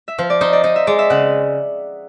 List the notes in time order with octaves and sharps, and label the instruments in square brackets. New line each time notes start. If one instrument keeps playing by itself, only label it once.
[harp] E5
[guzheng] F3 [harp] F5
[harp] D5
[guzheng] D#4 [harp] C5
[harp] D5
[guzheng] D#4 [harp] D#5
[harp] E5
[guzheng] G#3 [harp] D5
[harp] E5
[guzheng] C#3 [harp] F#5